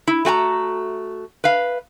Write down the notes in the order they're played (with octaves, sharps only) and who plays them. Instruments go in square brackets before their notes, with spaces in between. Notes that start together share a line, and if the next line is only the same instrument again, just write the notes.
[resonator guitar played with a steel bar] E4
A3 F#4 G#5 A#5
B4 F5